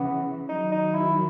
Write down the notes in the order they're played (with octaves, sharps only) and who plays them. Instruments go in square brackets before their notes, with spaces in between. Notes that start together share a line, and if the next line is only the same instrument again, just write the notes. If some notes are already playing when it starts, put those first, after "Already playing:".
Already playing: [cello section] C#3 E3 [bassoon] B3
[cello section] D#3 F#3 [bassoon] D#4
[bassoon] D#4
E4